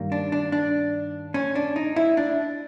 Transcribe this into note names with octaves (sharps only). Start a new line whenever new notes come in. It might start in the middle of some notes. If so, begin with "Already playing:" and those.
Already playing: G2 D#3 G3 A#3
D4
D4
D4
C#4
D4
D#4
E4
D4